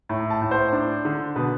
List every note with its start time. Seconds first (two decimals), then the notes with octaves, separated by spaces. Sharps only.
0.09 A2
0.30 A5
0.42 A2
0.51 C5
0.73 D4
1.05 D3
1.36 B2 B4